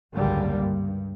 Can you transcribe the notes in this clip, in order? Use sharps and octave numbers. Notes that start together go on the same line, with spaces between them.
G#1 C#2 F#2 D3 G3 A#3
G2